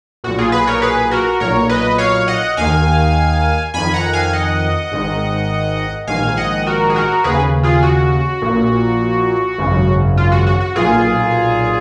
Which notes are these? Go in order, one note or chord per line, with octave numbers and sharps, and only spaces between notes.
B1 A#2 F#4
F4 G#4
G#4 B4
A#4 C#5
G#4 B4
F#4 A#4
B1 A#2 A#4 C#5
B4 D#5
C#5 F5
D#5 F#5
D#2 D#3 F5 G#5
F2 D#3 G#5 B5
F#5 A#5
F5 G#5
D#5 F#5
G#1 G#2 D#3
A#1 G#2 D#3 F5 G#5
D#5 F#5
F#4 A#4
G#4
F#4 A#4
D#2 C#3 G#4 B4
F4 G#4
F#4
A#1 A#2
G#1 F#2 C#3
F4
F#4
F#4
F#4
B1 A#2 F4 G#4